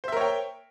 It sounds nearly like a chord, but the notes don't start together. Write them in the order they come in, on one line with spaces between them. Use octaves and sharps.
C5 E5 A#4 C#5 G5